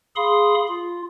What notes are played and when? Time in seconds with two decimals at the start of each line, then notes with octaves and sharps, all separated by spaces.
0.16 G#4 F5 B5 C6 D#6
0.68 F4